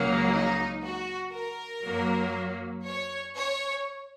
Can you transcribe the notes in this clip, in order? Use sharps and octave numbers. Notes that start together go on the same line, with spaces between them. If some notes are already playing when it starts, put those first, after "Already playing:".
Already playing: C#2 C#3 F#3 A#3
D#4
F#4
A#4
F#2 F#3 A#3
C#5
C#5